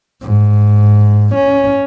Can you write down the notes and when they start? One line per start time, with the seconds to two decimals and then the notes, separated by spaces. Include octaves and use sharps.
0.22 G#2
1.35 C#4